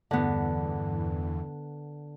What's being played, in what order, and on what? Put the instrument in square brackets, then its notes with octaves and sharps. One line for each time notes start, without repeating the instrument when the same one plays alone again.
[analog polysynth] E2 G2 E3 [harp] D3 B3